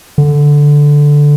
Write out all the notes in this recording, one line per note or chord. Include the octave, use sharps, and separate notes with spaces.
D3